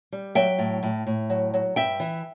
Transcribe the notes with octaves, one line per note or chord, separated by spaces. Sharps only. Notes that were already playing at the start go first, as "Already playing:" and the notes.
G3
F#3 E5 G5
A2
A2
A2
F#3
F#3
G2 E5 G5
E3